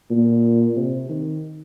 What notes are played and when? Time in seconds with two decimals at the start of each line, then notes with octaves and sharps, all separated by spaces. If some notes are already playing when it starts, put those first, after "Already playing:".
0.10 A#2
0.76 C3
1.09 D#3